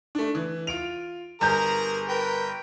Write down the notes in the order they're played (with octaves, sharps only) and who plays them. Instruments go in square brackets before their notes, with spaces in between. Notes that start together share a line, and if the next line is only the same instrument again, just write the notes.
[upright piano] A3 D4
E3
F4 D7 F7
[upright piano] G1 G6 [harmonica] G#4 A#4 A#5
[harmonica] A#4 B4 G5